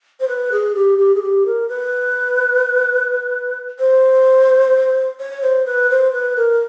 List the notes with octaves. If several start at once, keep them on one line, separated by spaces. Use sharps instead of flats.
C5
B4
G#4
G4
G4
G#4
G4
A#4
B4
C5
C#5
C5
B4
C5
B4
A#4